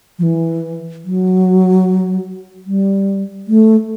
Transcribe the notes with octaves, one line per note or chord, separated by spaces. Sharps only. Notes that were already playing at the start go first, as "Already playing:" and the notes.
F3
E3
F#3
G3
A3